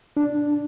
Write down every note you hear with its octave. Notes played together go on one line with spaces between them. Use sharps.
D4